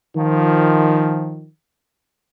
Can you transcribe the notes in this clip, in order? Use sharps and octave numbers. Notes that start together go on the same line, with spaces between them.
D#3 F3